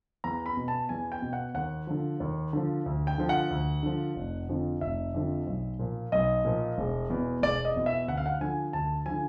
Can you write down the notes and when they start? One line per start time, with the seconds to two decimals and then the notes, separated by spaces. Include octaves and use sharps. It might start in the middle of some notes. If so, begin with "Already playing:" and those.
0.24 E2 A#5
0.46 B5
0.57 B2
0.68 A5
0.89 E2 G#5
1.12 G5
1.22 B2
1.33 F#5
1.54 D#2 F#5
1.87 D3 F3
2.20 D#2
2.53 D3 F3
2.86 D2
3.07 G5
3.18 D3 F3
3.29 F#5
3.51 D2
3.83 D3 F3
4.16 F1
4.49 F2 D3 F3
4.81 F1 E5
5.14 F2 D3 F3
5.47 B1
5.79 A#2 F3
6.12 B1 D#5
6.45 A#2 F3
6.78 E1
7.10 E2 B2
7.42 E1 D5
7.65 D#5
7.76 E2 B2
7.86 E5
8.08 D2 F#5
8.17 F5
8.26 F#5
8.40 D3 F3 G#5
8.73 D2 A5
9.06 D3 F3 G#5